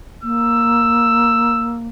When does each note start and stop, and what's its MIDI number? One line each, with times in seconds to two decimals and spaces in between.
0.23 1.88 58
0.23 1.77 88